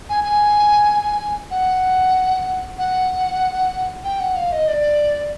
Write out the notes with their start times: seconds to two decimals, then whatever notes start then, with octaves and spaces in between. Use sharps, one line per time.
0.09 G#5
0.24 G#5
1.51 F#5
2.78 F#5
4.04 G5
4.20 F#5
4.36 F5
4.52 D#5
4.68 D5